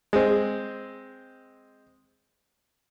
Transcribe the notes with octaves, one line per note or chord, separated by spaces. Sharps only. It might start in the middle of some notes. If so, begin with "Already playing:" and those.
G#3 C4